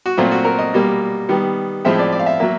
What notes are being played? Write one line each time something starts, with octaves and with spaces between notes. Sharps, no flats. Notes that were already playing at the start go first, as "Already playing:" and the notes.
F#4
A#2 F#3 A3 C4 F4
F#4
A#4
D#5
B2 G3 A#3
D#3 G3 B3
A2 F3 G#3 C4 E5
D5
D5
F5
E5
F#3 A#3 E5